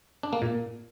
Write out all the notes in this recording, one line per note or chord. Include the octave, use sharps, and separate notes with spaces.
D4
A#3
A#2